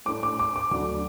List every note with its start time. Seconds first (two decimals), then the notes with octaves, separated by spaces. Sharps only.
0.06 A2 A3 D4 D6
0.23 D6
0.39 D6
0.56 D6
0.71 D2 D3 F#3 D4 D6